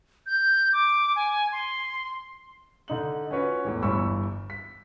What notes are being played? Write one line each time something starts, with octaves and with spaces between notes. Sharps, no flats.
G6
D6
G#5
C6
D3 D#4 F#7
C#4 F4 F#4 B4 C#5
E2 A2 E3
G1 G2 E3 B5 C#6 E6
B6